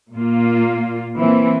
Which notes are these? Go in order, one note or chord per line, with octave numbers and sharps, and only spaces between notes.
A#2 A#3 F4
E3 A#3 C4 E4